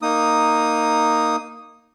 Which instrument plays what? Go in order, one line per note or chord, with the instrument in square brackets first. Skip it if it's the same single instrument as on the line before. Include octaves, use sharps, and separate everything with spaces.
[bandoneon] A#3 D#4 D#6